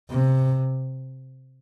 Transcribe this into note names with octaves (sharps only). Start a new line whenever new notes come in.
C3